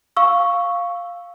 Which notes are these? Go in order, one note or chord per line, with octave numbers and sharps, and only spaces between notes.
F5 C#6 E6